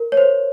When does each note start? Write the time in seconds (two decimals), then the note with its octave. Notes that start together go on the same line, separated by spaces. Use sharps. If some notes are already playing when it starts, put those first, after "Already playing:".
Already playing: A#4
0.12 C#5
0.17 C5